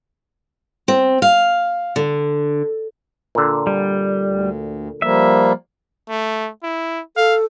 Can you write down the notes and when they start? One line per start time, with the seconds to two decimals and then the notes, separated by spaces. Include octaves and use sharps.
0.88 C4
1.22 F5
1.96 D3
3.35 A#2 D3
3.67 G3
4.25 D2
5.02 F3 G3 A#3 E5
6.09 A3
6.63 E4
7.17 A4 F5